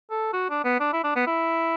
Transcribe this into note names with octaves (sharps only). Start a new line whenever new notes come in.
A4
F#4
D4
B3
D4
E4
D4
B3
E4